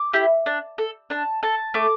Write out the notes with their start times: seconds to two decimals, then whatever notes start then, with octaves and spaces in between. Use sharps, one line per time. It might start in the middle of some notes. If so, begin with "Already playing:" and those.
Already playing: D6
0.13 E4 G4
0.46 D4
0.78 A4
1.10 D4 A5
1.43 A4 A5
1.74 A3 D6